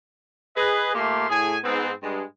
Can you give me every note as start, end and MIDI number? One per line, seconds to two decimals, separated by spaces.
0.56 0.91 68
0.56 0.91 71
0.56 0.91 75
0.95 1.29 46
0.95 1.29 57
0.95 1.29 58
0.95 1.29 67
0.95 1.29 77
0.95 1.29 84
1.29 1.57 45
1.29 1.57 68
1.29 1.57 80
1.64 1.91 44
1.64 1.91 59
1.64 1.91 60
2.03 2.22 43
2.03 2.22 56